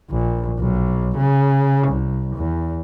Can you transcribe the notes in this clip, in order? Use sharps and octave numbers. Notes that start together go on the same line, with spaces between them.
A#1
B1
C#3
C2
E2